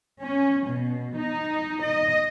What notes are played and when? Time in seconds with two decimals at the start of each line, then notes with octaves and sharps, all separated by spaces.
0.21 C#4
0.68 B2
1.17 D#4
1.83 D#5